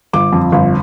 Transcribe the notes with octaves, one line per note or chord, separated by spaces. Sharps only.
G1 D6
F2
G1